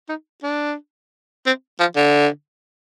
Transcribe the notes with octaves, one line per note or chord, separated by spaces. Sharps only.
D#4
D4
C4
F3
D3